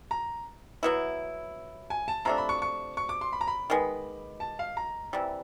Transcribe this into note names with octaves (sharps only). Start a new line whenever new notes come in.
A#5
F#3 B3 E4
G#5
A5
C3 F3 A3 D4 A#5
B5
C#6
C#6
C#6
D6
C6
B5
A#5
B5
D#3 G#3 B3
A5
F5
A#5
C3 E3 G3